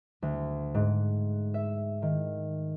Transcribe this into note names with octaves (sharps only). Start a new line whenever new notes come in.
D2
G#2
E5
D#3